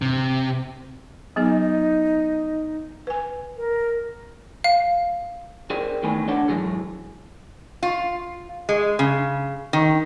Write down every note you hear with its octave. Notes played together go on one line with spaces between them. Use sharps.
C3
F#3 B3 D#4 G#4
B4 G#5
A#4
F5
G#4 A#4 C5 D5 G5
E2 D#3 A3 B4 G#5
D4 A4 C#5 D5 F#5 A5
G#2 C#3 E3 F#3 G#4 A4
F4
G#3
C#3
D#3